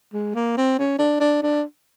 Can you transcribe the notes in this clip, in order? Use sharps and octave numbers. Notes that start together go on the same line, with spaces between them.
G#3
A#3
C4
C#4
D4
D4
D4